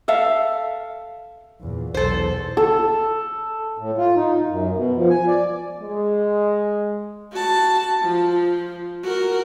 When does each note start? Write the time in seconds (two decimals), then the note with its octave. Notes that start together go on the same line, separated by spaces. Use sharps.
0.08 A4 E5 F5
1.61 E2 A#2
1.94 B1 E2 A4 C5
2.57 A4
3.78 A2
3.98 F4
4.16 D#4
4.49 F#2
4.76 B2
4.96 F3
5.10 G#5
5.27 D5
5.82 G#3
7.33 F#4 A5
8.02 F3
9.03 F#4 A#4